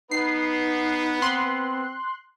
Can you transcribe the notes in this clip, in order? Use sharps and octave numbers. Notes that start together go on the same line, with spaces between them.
B3 D#4 B4 C7
C4 C6 F#6